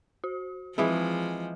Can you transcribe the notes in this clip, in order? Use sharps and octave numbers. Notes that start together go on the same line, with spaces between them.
F#4
E3 F3 G#3 C4 E4